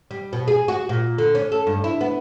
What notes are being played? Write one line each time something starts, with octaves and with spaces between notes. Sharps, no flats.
G3
B2
G#4
F#4
A#2
D3
C#4
A4
G2
E4
B3